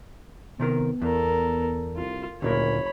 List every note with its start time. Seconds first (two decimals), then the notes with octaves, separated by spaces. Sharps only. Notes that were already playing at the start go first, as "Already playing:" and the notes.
0.60 C3 D#3 B3 A#4
1.01 E2 A4 A#4
1.96 C2 F4
2.42 F#1 D2 A#2 A#4 C#5 B5